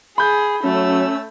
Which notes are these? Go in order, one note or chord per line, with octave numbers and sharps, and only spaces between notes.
G#4 B5 G6
F#3 A3 C#4 E6